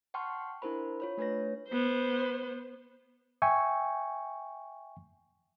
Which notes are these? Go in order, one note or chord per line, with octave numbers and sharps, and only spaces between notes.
F#5 G5 A5 C6 C#6 F6
D4 E4 A#4 C5 B5
F4 C#5 B5
A3 D4 B4 C#5 A#6
B3 C5
E5 G5 G#5 C#6